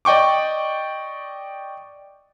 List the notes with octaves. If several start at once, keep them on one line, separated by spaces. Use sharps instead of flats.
D5 D#5 G5 C#6 D6